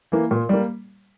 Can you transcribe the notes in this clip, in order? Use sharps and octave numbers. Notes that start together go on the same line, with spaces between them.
E3 A#3
A#2
G3 A#3